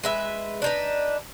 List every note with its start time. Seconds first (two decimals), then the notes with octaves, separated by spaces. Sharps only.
0.04 G#3 B4 E5
0.62 D4 D#4 B4